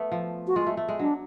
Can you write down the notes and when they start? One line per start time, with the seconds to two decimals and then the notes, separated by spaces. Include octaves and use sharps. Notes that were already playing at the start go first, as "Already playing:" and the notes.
Already playing: A3 B3
0.12 F3
0.47 F#4
0.56 G#3 F4
0.67 A3
0.77 A3
0.88 G#3
0.99 F#3 D4